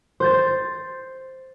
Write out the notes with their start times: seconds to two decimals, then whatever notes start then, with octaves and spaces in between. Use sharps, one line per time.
0.20 C5 G6 A6